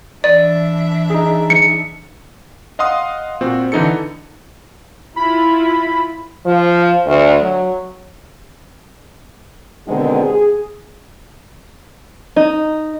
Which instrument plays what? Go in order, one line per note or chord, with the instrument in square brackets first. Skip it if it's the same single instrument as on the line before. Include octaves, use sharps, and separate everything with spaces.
[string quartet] E3 D4 E5 [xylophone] D5
[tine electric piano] D#4 G#4
[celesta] C#7
[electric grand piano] D#5 F5 F#5 C6 D#6
A#2 C4 F#4
D3 E3 D#4 A4 C#7
[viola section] E4 F4 [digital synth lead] B5
[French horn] F3
D2
F#3
[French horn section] B2 D3 D#3 G#3 C4 G#4
G#4
[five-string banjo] D#4